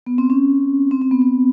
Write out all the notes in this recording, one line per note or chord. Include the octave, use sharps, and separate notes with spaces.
B3
C4
C#4
C4
C4
B3
C4